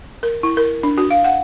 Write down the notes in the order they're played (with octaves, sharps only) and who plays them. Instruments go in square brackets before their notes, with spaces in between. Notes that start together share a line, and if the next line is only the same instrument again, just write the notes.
[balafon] A#4
E4
A#4
D4
F#4
F5
F#5